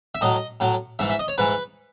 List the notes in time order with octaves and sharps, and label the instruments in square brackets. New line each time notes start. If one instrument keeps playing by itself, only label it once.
[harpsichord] E5
A2 F#3 D#5
A2 F#3
G#2 E3 E5
E5
D#5
C#5
G#2 E3 B4